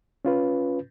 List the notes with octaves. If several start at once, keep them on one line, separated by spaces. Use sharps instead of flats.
C#4 F4 B4